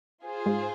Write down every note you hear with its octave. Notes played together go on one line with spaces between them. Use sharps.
F4 G#4 C5
G#2